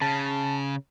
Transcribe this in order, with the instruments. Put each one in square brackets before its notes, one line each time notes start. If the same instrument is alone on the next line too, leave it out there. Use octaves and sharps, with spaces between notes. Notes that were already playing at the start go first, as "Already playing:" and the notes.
[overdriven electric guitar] C#3 [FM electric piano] A5